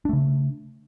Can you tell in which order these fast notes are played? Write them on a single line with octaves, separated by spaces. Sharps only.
D4 A3 C#3